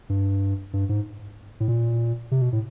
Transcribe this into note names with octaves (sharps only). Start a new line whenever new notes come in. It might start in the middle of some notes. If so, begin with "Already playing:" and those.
G2
G2
G#2
A2
A#2
C3
B2
A2